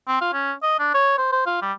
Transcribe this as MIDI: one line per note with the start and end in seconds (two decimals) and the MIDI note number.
0.08 0.17 60
0.21 0.31 65
0.33 0.52 61
0.63 0.78 75
0.79 0.92 62
0.94 1.13 73
1.18 1.28 72
1.32 1.41 72
1.46 1.58 65
1.62 1.72 55